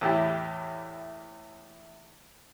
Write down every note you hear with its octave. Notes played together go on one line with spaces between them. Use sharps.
E2 A2 E4 G4